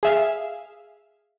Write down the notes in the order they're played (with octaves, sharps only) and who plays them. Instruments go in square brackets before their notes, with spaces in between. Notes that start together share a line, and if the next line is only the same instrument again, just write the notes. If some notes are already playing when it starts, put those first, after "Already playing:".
[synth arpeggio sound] G#4 E5 F5